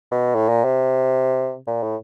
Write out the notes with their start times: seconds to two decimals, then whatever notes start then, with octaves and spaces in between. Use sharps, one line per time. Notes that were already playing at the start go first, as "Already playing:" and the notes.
0.11 B2
0.34 A2
0.48 A#2
0.64 C3
1.67 A#2
1.83 A2